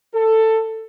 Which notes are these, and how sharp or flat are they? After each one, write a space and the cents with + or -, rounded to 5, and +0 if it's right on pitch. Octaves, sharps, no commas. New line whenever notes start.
A4 +15